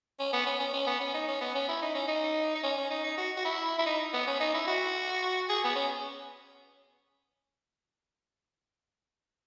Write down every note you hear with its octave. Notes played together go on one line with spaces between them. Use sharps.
C#4
B3
C#4
C#4
C#4
B3
C#4
D#4
C#4
B3
C#4
E4
D#4
C#4
D#4
D#4
C#4
C#4
D#4
D#4
F#4
F#4
E4
E4
D#4
B3
C#4
D#4
E4
F#4
G#4
B3
C#4